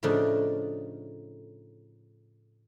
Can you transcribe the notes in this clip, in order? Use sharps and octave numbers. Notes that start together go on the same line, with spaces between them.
A2 C#3 F3 A3 D4 D#4